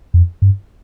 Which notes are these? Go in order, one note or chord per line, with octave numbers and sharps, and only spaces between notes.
F2
G2